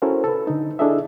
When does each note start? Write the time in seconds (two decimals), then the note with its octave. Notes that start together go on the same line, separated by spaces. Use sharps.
0.02 C#4 E4 F#4 A4 A#4 C5
0.24 A4 B4
0.47 D3 D#4
0.79 D4 E4 G#4 A4 D#5 E5